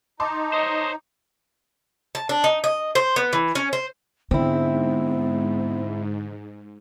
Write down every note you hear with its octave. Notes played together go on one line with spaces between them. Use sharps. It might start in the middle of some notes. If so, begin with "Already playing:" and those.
D#4 A5 C6 D6
C5 C#5 D#5
A5
D4
D#4
D#5
C5
B3
E3
C#4
C5
G#2 D3 B3 C4 E4